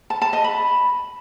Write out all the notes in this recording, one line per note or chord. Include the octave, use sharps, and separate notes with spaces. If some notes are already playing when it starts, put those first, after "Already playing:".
A5
A5
D#5
B5